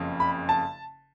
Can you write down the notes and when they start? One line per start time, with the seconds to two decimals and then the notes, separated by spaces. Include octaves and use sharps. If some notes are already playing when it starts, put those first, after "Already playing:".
Already playing: F#1 F2 C#3
0.20 B5
0.49 A5